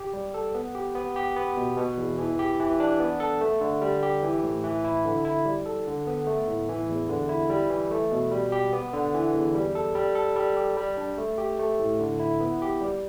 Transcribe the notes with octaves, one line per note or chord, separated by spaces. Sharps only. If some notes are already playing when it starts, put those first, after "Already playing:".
Already playing: G4
G3
A4
B3
G4
B3
G4
B3
B2
B2
E2
E3
G4
E3
D4
B3
A4
A3
D3
G3
G4
E3
A2
E3
E4
D3
E4
G3
A4
D3
B3
A3
A2
E3
E2
D3
E4
G3
E3
A3
B2
G3
G4
B3
D3
E3
E2
G3
A4
G3
A4
G3
G4
G3
D4
A3
G4
A3
A2
D3
E4
B3
G4
G3